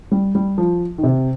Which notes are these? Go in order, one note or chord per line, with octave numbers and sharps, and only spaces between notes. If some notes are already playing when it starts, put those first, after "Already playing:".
G3
G3
F3
D#3
C3